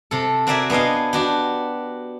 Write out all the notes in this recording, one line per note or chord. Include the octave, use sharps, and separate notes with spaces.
C3 A4
C4 F#4 A#4 D5 E5 G#5
B3 D4 G#4 D#5 F5
D4 F#4 G4